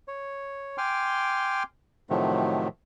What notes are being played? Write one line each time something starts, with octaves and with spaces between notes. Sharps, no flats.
C#5
G5 G#5 C6 D6 F6
A2 C3 D#3 F3 F#3 A3